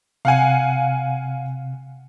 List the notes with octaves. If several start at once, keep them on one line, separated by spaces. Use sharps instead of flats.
C3 F5 F#5 G#5